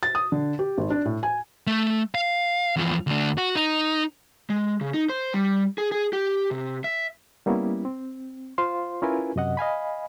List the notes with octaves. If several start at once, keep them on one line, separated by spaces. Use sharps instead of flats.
A6
D#6
D3
G4
G#1
D4
A2
G#5
A3
F5
E2 F3
D2 D4
F#4
D#4
G#3
C#3
D#4
C5
G3
G#4
G#4
G4
C3
E5
G3 A#3 B3 C#4 E4
C4
F4 C5 F5 C6
C#4 E4 F4 A#4 B4 G#5
F#2 C3 D#5 F#5
D#5 F5 G#5 B5